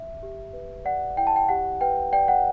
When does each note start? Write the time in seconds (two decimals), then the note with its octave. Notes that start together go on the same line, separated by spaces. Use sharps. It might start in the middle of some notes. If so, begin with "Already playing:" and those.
Already playing: E5
0.23 G4
0.53 B4
0.85 D5 F#5
1.17 E4 G5
1.27 A5
1.36 G5
1.49 G4 F#5
1.81 B4 G5
2.12 D5 G5
2.28 F#5